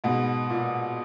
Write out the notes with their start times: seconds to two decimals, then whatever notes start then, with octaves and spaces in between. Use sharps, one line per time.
0.04 G#2 B2
0.50 A#2